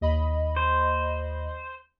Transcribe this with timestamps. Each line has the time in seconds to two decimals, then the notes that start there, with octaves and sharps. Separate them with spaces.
0.01 D#2 D#5 B5
0.56 C5